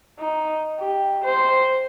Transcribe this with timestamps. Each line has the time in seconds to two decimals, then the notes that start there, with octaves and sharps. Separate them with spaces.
0.19 D#4
0.80 G4
1.24 C5